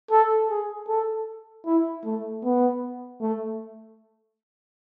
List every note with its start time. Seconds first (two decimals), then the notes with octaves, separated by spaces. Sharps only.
0.11 A4
0.49 G#4
0.88 A4
1.66 E4
2.04 A3
2.43 B3
3.21 A3